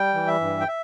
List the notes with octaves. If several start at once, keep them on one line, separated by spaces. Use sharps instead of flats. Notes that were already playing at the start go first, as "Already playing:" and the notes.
Already playing: G3 G5
E3
E5
G2
G5
E5